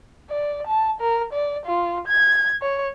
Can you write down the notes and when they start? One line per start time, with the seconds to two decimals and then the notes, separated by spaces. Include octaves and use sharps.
0.30 D5
0.67 A5
1.01 A#4
1.33 D5
1.66 F4
2.08 G#6
2.62 C#5